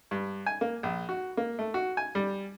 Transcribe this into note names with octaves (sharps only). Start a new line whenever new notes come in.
G2
G#5
A#3
A#1
F#4
A#3
A3
F#4
G#5
G3